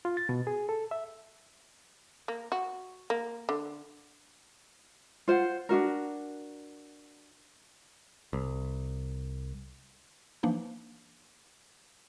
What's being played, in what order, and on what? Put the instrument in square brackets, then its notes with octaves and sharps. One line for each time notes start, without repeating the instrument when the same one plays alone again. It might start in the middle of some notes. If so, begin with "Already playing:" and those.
[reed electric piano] F4
A6
B2
G#4
A4
E5
[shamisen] A#3
F#4
A#3
D3
[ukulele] F4 C5 F#5
D4 D#4 F#4 A#4
[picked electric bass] C2
[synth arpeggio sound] E3 F3 A#3 D4 D#4